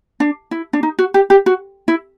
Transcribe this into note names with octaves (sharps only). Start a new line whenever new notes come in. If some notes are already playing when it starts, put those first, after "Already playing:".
D4
E4
D4
D#4
F#4
G4
G4
F#4
E4